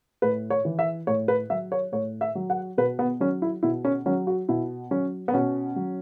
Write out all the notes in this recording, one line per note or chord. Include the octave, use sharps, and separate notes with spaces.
A2 B4
C#5
E3
E5
A2 C#5
B4
F#3 E5
C#5
A2 C#5
E5
F#3
F#5
B2 B4
B3
F#3 C#4
E4
B2 E4
C#4
F#3 C#4
F#4
B2 E4
F#3 C#4
B3
B2 C#4
F#3